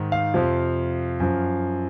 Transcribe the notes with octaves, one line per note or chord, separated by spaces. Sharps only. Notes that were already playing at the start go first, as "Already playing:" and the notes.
Already playing: G#2 D#3
F5
F2 C3 F3
F#2 F3